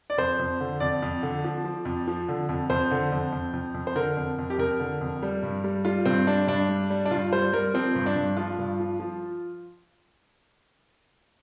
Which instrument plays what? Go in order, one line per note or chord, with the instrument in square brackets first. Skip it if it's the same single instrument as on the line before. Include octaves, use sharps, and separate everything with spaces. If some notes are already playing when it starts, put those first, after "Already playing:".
[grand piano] D5
F2 C5
F2
D3
F2 D5
F2
D3
F3
F3
F2
F3
D3
F2
F2 C5
D3
F2
F2
F2
F2
C5
D3 A#4
F2
F2
G4
F2 A#4
D3
F2
G3
G2
G3
G3 F4
G2 C4
G3 D4
G2 D4
G3
G3
D4
G2 F4
G3 C5
G3 A#4
F3 C4
G2
D4
G2
F3 F4
G2
F3
F3